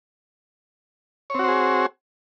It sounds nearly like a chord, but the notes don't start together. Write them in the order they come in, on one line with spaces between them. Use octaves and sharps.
C#5 C4 F#4 C5 G#4